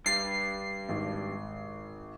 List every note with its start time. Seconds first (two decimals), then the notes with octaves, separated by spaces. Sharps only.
0.06 G2 A6 C7
0.89 G#1